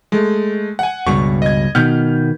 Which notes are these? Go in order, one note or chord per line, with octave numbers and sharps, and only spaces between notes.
G#3 A3
F#5 G#5
C#2 G2 B2 C#6
D#5 G#6
B2 D#3 B3 F6 G6